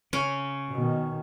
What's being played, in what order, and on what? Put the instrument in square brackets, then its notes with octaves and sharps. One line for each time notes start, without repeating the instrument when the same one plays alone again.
[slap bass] C#3 [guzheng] C#4
[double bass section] B2 D#3